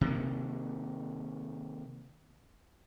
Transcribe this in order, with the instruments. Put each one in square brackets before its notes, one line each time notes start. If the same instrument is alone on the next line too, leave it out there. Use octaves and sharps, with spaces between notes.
[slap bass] C3 D#3 A#3